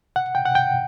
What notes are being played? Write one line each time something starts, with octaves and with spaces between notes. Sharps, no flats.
F#5
G5
F#5
G5